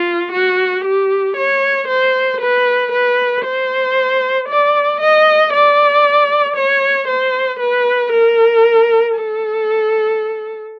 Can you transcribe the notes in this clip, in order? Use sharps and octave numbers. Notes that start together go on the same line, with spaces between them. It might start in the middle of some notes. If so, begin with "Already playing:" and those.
Already playing: F4
F#4
G4
C#5
C5
B4
B4
C5
D5
D#5
D5
C#5
C5
B4
A#4
A4